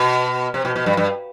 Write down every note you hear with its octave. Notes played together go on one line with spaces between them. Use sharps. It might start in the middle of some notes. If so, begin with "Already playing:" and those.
Already playing: B2
C3
B2
B2
G2
G2